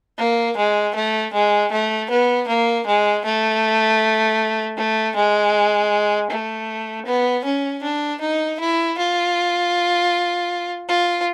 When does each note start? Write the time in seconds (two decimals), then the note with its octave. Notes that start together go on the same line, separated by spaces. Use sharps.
0.19 A#3
0.57 G#3
0.95 A3
1.33 G#3
1.72 A3
2.10 B3
2.48 A#3
2.87 G#3
3.25 A3
4.77 A3
5.16 G#3
6.31 A3
7.06 B3
7.45 C#4
7.83 D4
8.21 D#4
8.60 E4
8.98 F4
10.89 F4